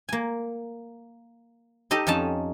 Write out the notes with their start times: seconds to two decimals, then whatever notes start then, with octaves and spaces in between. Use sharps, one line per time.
0.09 A#3 G#5
1.91 D#4 G4 A4 D#5
2.07 F2 C#4 D#4 A5